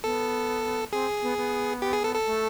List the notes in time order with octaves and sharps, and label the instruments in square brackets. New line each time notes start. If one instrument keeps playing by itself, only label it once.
[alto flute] B3 [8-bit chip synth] A4
[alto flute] C4 [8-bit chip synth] G#4
[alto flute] B3
B3
[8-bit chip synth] G4
G#4
A4
A4
[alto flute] A3